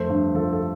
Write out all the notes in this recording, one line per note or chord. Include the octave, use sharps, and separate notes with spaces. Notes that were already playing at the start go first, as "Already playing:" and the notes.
Already playing: F2 D3 A3 C5
G2
F3 A4
A4